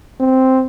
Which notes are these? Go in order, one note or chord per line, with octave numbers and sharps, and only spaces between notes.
C4